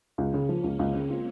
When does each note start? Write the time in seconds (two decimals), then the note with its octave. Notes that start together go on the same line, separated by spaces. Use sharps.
0.18 C#2 A#3 C#4
0.33 C#3
0.49 F3
0.64 C#2 G#3 C4
0.79 C#2
0.95 C#3
1.10 F4